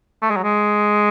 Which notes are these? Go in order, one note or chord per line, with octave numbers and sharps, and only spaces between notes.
A3
G#3
F#3
G#3